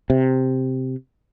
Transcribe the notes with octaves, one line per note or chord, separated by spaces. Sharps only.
C3